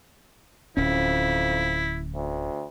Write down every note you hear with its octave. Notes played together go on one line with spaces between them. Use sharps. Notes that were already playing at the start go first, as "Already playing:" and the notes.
D1 F2 C#4 E4
D2